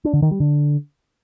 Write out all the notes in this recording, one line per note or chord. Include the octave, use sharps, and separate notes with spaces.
D4
D3
D#3
G3
D3